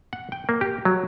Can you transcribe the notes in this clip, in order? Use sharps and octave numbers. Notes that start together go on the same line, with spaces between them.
F#5
G5
A#3
G4
F#3